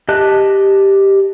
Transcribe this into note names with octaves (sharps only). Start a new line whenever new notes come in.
G4 D#5 A5 F#6